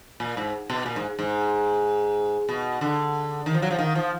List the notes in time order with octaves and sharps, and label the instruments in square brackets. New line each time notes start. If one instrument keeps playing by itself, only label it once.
[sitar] A#2
G#2
B2
A#2
G#2
G#2
B2
D3
D#3
F3
F#3
F3
D#3
F3